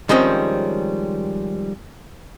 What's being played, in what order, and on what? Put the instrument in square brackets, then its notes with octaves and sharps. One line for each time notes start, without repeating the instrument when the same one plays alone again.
[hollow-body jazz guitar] D#3 F3 G3 G#3 C4 C#4